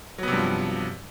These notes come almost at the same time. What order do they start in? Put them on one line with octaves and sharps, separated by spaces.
F#3 B3 C3 G2 F3